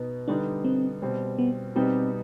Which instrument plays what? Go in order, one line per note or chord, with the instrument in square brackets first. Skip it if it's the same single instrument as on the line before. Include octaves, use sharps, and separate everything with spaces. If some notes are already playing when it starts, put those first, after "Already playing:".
Already playing: [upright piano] B2 B3 D#4
[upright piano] D3 G3 B3 D#4 [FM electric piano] D4
[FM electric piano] C4
[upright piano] B2 G3 C4
[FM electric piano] B3
[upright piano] B2 G3 B3 D#4 G4 [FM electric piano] C4